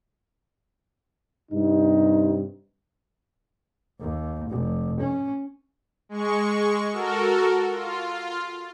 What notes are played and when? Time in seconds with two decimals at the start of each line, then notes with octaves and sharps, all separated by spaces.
1.51 G2 C3 D#4
4.00 D#2
4.51 F1
5.00 C#4
6.09 G#3 C#6
6.93 F#4 A4 A#4
7.72 F4